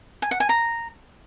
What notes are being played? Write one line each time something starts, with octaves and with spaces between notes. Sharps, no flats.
G#5
F#5
G#5
A#5